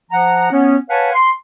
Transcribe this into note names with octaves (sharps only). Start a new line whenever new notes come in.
F3 F#5 A#5
B3 C#4
B4 C#5 F5 F#5 G#5 A5
C6